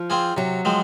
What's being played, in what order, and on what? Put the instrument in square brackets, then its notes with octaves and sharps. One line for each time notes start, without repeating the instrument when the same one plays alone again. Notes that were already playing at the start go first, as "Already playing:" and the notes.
Already playing: [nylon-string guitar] F3
[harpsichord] C4 F4 G#4
[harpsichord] C3 [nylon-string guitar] F#3
[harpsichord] F3 G#3 C4